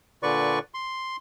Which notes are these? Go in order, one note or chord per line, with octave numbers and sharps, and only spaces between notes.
A#2 D3 B4 D5 C#6
C6